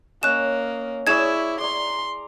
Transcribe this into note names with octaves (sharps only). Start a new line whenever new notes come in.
A#3 C#4 D#5 F#6 E7
E4 G#4 C#5 D5 G#6 E7
D5 A#5 C6